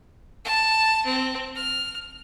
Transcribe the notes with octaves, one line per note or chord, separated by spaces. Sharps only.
A5
C4
F6